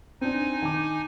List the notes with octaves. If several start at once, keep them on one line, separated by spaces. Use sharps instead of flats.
C4 D4 D#4 G#5
D#3 A5 D6